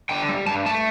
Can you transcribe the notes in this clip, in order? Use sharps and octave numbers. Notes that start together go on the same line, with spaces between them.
D3 G5
G3
G2 A5
A3 A5